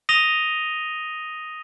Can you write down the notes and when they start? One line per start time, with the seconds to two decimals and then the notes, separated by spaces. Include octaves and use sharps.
0.09 D#6 A#6 D#7 F7 G7